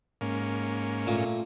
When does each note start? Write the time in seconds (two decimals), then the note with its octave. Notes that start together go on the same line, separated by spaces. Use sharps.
0.21 G#2 A#3 C#4
1.06 A#2 A3